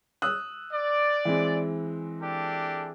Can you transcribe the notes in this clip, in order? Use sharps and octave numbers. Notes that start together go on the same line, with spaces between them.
D#6 E6 F#6
D5
E3 G#3 C4
D4 G4 A4